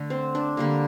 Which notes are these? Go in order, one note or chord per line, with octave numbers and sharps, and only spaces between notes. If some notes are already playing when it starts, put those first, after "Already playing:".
Already playing: D3 A3 D4
C4
D4
D3 G3 A#3